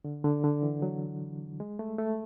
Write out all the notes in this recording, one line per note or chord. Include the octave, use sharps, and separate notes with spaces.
D3
D3
D3
E3
F#3
G#3
A3
A3